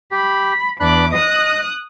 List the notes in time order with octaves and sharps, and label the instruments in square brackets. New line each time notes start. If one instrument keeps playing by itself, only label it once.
[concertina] G4 [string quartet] B5
[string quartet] E2 D6 [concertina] D4 B5 F#6
[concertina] D#5 [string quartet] D#6 F#6